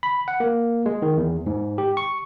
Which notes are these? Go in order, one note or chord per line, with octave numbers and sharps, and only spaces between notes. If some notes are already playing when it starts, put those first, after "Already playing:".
B5
F#5
A#3
G#3
D#3
E2
G#2
G4
C#6